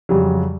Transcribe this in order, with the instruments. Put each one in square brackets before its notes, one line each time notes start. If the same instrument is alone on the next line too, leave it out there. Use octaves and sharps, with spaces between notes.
[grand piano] F2 C#3 F#3 [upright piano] G3